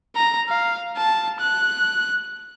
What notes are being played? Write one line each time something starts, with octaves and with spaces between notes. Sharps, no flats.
A#5
F5
A5
F#6